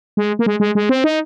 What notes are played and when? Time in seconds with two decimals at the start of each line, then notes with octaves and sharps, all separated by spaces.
0.17 G#3
0.39 A#3
0.46 G#3
0.60 G#3
0.75 G#3
0.89 C4
1.04 D#4